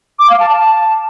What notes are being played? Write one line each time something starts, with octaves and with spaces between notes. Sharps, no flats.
D6
F5
A5
A5